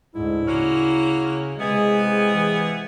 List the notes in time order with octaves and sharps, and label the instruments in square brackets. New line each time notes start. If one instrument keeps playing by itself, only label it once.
[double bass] D2 G#2 [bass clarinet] E4
[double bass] C#3 [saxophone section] A#3 C#4 F#4
[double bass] C3 G#3 [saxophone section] B3 E4 G#4
[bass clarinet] E3